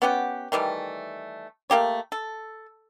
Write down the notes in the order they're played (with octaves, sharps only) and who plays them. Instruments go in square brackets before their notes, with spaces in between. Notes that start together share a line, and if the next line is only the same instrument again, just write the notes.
[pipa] B3 C#4 G4 F#5
D#3 E3 G3 A3
A3 A#3 G4 C#5
A4